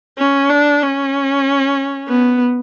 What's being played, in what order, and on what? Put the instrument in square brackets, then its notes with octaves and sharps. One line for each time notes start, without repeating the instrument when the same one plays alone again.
[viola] C#4
D4
C#4
B3